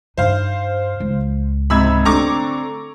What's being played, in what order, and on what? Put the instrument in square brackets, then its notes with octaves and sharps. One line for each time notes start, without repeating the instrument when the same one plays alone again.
[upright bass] G2 D#4 [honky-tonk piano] C5 F5
[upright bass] C#2
[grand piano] G#2 C3 [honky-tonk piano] B5 E6 G#6
[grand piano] D3 C4 [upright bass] A3 [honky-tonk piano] A#5 C#6 D6